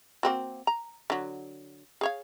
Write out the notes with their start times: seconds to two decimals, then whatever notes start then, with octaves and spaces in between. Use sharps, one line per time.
0.23 A#3 C4 F#4
0.67 A#5
1.10 D3 F#3
2.01 G#4 C#5 F5